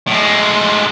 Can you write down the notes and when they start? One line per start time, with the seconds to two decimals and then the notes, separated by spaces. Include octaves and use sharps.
0.07 A2 G#3